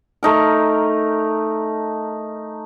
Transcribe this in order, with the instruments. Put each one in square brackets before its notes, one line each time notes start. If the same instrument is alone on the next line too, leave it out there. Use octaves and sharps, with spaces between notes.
[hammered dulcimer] A3 D#4 A#4